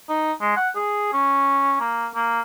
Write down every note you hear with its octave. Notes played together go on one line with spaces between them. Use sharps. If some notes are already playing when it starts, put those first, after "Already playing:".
D#4
G#3
F#5
G#4
C#4
A#3
A#3